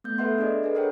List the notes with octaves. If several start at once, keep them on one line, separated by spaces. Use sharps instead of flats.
A3 B3 G6
A4 B4 E5 F#5 C6
D4 G#4 D5 D#5
D4 G#4 A4 B4
D4 A#4 B4 C#5 F#5 G5